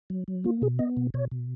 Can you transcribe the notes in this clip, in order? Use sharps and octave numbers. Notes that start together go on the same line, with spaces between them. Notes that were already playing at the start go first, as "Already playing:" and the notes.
F#3
F#3
A#3 F4
B2 G#4
B3 D#5
B2
B2 C#5
B2